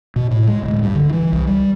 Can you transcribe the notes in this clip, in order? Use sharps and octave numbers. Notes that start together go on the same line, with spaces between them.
B2
A2
G#3
D1
G2
D3
E3
C2
G3